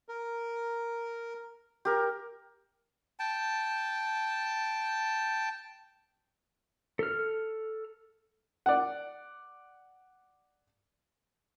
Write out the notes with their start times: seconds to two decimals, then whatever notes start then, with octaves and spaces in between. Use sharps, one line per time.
0.09 A#4
1.85 G4 A#4
3.19 G5 A5
6.99 A4 F6
8.66 D5 F#5